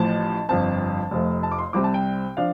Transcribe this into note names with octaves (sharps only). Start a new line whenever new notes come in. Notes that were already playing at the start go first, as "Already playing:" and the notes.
Already playing: A1 A2 F3 A5
G1 F2 F3 C4 A5
F1 F2 F3 A3
A5
D6
C6
C2 C3 G3 C4 D6
A5
G5
F3 D4 F5